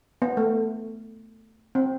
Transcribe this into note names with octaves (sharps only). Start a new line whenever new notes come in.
B3
A3
C4